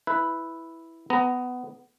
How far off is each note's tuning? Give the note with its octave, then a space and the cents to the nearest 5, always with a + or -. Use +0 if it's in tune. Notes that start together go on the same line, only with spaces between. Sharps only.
E4 +0 B4 +0
B3 +15 A#5 +0